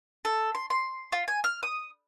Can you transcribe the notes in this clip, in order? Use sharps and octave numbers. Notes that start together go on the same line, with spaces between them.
A4
C6
C6
F4
G#5
F6
D#6